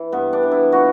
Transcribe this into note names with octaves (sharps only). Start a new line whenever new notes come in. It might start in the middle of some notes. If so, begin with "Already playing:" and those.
Already playing: E3
G2 B3
D4
E3
E4
A#2 F#4